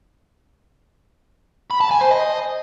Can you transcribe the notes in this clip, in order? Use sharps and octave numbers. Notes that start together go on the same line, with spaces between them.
B5
A5
G#5
C5
D#5